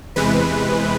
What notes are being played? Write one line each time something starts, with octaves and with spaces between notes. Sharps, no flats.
E2 C3 E3 G#3 B4